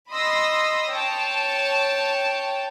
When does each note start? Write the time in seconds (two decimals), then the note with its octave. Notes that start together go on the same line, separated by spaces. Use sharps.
0.11 D#5 B5 C6 D#6 E6 A#6
0.91 C#5 G5 A5